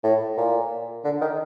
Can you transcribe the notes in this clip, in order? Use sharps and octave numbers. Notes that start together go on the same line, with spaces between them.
A2
A#2
D3
D#3